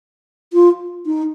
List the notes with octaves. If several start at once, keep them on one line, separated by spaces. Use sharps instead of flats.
F4
D#4